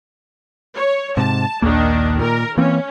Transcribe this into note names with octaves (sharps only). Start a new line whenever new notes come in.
C#5
G#2 C3 A5
A#1 D#2 D#3 A#3 D4
A#2 A#4
E3 A#3 C4 C#4